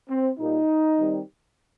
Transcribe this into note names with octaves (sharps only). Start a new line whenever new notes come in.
C4
A#2 G3 A#3 D#4
D#3 G3 C4